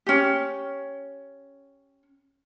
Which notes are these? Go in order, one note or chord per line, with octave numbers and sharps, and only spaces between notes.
C#4 G4